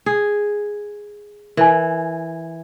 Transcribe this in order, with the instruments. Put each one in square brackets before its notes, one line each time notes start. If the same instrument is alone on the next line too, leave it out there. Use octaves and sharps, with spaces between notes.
[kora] G#4
[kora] E3 [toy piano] A#4 G#5